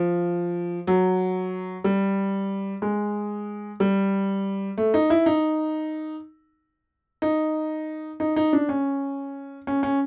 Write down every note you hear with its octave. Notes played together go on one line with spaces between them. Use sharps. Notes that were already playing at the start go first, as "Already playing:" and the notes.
Already playing: F3
F#3
G3
G#3
G3
A3
D#4
E4
D#4
D#4
D#4
D#4
D4
C#4
C#4
C#4